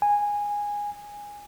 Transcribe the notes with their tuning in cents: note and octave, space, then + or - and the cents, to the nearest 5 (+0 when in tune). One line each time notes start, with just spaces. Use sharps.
G#5 -10